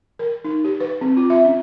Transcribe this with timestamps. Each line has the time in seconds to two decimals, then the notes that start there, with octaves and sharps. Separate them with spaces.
0.19 A#4
0.45 D#4
0.65 G4
0.80 B4
1.01 C4
1.17 F4
1.30 E5
1.45 C#4